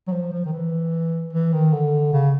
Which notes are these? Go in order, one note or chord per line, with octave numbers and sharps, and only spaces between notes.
F#3
F3
F3
D#3
E3
E3
D#3
D3
C#3